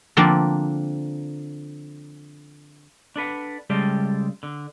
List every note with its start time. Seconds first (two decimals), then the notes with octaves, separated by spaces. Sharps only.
0.17 D3 F3 A#3 C4 D4 A#4
3.16 D4 A4 B4 F#5
3.70 C#3 G3 G#3 A4 D5 G5
4.43 D3